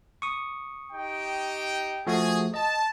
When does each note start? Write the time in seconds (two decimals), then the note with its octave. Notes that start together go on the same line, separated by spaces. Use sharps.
0.22 C#6 D#6
0.93 D#4 G4 G5
2.07 F3 A3 F#4 G#4
2.54 D#5 A5